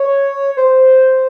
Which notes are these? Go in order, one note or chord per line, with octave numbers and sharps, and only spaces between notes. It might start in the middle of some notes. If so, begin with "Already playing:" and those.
Already playing: C#5
C5